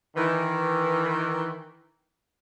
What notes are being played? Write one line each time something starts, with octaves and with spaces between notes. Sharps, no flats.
D#3 E3